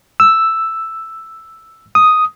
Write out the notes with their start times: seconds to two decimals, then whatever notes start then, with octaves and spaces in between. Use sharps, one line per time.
0.20 E6
1.95 D#6